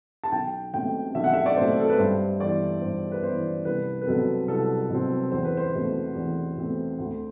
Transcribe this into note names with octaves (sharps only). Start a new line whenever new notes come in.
A5
B1 G5
B2 A3 C4 G5
B1 E5
F#5
E5
D5
B2 A3 C4 C5
A4
B4
G2 C5
E3 B3 D5
G2 C5
B4
E3 B3 C5
C2 B4
B4
B2 F#3 C4 A4
C2 A4
B2 F#3 C4
E2 C5
B4
C5
B2 A3 C4
E2
B2 A3 C4
D2